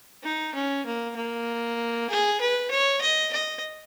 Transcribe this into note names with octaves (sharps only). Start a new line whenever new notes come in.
D#4
C#4
A#3
A#3
G#4
B4
C#5
D#5
D#5